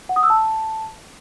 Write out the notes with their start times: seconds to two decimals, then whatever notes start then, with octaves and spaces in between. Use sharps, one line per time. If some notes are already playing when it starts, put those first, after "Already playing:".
0.09 F#5
0.16 D#6
0.23 E6
0.30 A5